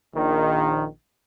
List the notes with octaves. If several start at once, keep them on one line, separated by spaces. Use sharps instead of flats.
A#1 D#3